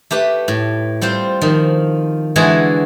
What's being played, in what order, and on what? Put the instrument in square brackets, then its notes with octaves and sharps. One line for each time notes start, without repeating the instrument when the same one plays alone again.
[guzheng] A3 G4 B4
A2
G3 C4 F4 C5
D#3 F3
D3 E3 G#3 F#4 G#4 A4